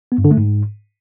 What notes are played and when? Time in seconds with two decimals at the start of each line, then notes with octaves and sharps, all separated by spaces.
0.12 B3
0.18 G2
0.25 D3
0.31 A3
0.37 G#2